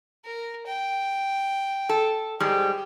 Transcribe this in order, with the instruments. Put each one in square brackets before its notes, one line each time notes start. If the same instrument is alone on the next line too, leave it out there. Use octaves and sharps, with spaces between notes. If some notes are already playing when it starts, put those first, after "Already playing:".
[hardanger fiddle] A#4
G5
[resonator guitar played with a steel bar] A4
[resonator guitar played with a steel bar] G#2 G3 G#3 [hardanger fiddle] G4